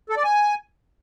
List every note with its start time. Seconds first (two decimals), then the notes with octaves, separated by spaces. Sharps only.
0.09 A4
0.17 D5
0.24 G#5